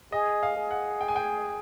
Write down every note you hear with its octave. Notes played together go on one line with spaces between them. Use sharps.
G#4 D#5
F5
G#4
F#5
G5
G#5
G5